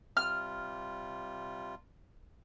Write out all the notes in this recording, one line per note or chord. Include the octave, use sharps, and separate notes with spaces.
C3 G3 F4 F6